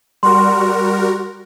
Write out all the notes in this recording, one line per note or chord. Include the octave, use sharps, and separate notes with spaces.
G3 F#4 A#4 C6